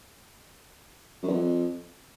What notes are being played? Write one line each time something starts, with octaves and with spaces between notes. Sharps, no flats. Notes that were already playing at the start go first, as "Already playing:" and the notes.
F#2
E2
F2